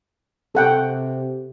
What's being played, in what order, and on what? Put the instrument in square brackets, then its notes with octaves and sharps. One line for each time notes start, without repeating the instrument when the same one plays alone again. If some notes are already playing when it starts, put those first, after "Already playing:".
[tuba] C3 [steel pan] A4 F#5 G5